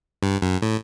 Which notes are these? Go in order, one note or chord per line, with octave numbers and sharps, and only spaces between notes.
G2
F#2
A2